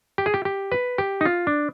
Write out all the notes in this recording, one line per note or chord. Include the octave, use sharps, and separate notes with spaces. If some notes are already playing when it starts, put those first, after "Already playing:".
G4
G#4
G4
G4
B4
G4
D#4
F4
D4